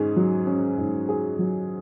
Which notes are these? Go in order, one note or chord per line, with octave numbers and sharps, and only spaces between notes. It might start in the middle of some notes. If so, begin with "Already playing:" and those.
Already playing: G#2 C#4 G#4
F#3
C#4
G#2
G#4
F#3